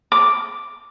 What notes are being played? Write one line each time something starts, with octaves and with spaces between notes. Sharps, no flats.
D6